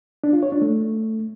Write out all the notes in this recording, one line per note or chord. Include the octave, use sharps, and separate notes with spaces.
D4
F4
C#5
D4
A3